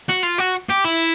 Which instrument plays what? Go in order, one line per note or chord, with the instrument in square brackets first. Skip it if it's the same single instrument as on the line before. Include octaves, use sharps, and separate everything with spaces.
[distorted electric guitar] F#4
F4
F#4
G4
E4